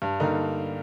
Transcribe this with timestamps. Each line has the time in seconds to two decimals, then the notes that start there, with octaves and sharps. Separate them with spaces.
0.02 G2
0.20 D3 G3 A#3 D#4